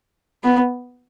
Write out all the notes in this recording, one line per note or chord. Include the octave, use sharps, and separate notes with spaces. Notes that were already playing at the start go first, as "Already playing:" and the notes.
B3